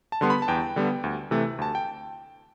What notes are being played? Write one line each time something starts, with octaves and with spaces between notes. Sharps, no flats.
A5
D3 G3 B3 C6
B5
A5
E2 G5
D3 G3 B3
D2
C3 E3 A3
D2 A5
G5